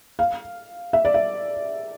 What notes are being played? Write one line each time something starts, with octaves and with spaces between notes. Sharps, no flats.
F5
E5
D5
E5